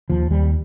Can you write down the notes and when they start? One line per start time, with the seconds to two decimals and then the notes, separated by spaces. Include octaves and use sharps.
0.10 D#2 F3
0.31 D#2 G3